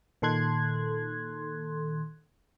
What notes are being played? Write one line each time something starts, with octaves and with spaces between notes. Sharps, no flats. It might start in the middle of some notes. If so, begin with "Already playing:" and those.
A#2 D#3 A4 C6 F#6 G#6